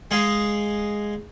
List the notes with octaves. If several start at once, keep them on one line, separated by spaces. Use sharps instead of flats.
G#3 G#4 F5